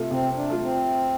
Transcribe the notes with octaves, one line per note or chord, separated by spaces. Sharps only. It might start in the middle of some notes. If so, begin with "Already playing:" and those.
Already playing: C3 A3 F4 A4
C3 C4
D4
A3 F4 A4
C4